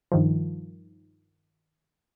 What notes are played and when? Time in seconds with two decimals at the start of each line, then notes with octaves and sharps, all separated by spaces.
0.12 G2 D#3 F3